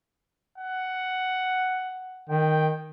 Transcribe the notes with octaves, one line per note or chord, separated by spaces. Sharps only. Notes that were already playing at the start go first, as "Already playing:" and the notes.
F#5
D#3 G5